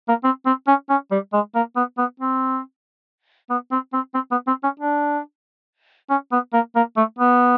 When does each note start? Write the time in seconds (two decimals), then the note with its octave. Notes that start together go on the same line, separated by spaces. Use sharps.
0.08 A#3
0.24 C4
0.46 C4
0.67 C#4
0.89 C#4
1.11 G3
1.33 G#3
1.55 A#3
1.76 B3
1.98 B3
2.19 C4
3.50 B3
3.71 C4
3.93 C4
4.14 C4
4.31 B3
4.47 C4
4.63 C#4
4.79 D4
6.09 C#4
6.32 B3
6.53 A#3
6.75 A#3
6.96 A3
7.19 B3